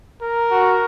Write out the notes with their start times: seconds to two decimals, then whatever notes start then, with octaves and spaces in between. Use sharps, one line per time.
0.22 A#4
0.51 F#4